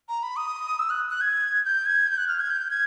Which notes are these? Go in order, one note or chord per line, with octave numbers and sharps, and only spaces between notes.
A#5
B5
D#6
E6
F#6
F#6
G#6
G6
G#6
G6
F#6
F6
G#6
G6
G#6